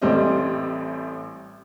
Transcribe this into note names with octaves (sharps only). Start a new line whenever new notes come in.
A1 A2 G3 C4 D#5